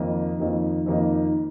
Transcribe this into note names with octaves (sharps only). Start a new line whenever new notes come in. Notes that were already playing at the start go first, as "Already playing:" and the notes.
Already playing: F2 D#3 A#3 D#4
F2 D#3 A#3 D#4
F2 D#3 A#3 D#4